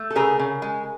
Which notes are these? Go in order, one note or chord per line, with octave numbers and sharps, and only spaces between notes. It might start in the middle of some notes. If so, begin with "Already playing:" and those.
Already playing: A3
A4
C#3 G#4 A#4
C#3
G#3